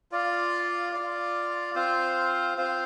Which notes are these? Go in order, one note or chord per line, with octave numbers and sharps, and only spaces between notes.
F4 D5 F5
F4 D5 F5
C4 F4 C5 F5
C4 F4 C5 F5